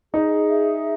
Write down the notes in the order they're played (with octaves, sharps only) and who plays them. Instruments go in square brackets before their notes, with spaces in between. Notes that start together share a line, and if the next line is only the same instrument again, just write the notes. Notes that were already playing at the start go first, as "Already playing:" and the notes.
[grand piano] D#4 [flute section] G#4
[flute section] E5